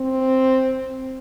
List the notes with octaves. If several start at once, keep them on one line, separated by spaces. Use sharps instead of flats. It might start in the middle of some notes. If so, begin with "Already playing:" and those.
Already playing: C4